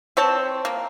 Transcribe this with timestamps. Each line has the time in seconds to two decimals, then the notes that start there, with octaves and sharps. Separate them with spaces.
0.17 C4 C#5 A5
0.65 A#3